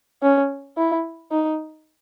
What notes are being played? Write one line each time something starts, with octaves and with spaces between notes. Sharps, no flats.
C#4
E4
D#4